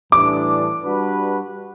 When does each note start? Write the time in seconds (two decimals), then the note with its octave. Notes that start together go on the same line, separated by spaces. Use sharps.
0.12 A2 E3 G3 D4 D6
0.83 G3 D4 F#4 B4